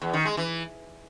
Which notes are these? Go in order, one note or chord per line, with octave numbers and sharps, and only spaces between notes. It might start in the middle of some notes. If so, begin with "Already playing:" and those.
E2
D#3
G#3
E3